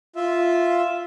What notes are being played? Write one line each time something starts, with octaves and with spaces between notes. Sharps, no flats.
F4 E5